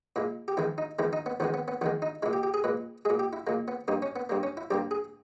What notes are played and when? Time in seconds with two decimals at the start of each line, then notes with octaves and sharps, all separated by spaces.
0.16 A#2 G#3 E4
0.48 G4
0.57 E2 D#3 G#3 E4
0.78 D#4
0.99 E2 D#3 G#3 E4
1.13 D#4
1.26 B3
1.40 E2 D#3 G#3 B3
1.54 B3
1.68 B3
1.81 E2 D#3 G#3 B3
2.02 D#4
2.23 G#3 E4
2.26 A#2
2.33 G4
2.43 G4
2.54 G#4
2.64 A#2 G#3 B4
3.05 A#2 G#3 G#4
3.19 G4
3.33 E4
3.47 A#2 G#3 A#3
3.68 B3
3.88 G2 G3 A#3 D#4
4.02 C#4
4.16 B3
4.29 G2 G3 A#3
4.43 C#4
4.57 E4
4.71 G2 G3 A#3 G4
4.91 G#4